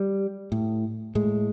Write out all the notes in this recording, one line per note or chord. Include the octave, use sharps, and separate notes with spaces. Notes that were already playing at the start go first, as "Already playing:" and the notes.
Already playing: G3
A2
A2 G#3